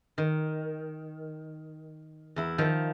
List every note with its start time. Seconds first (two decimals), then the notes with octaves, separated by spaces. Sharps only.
0.18 D#3
2.36 E2 E4
2.58 D#3 F3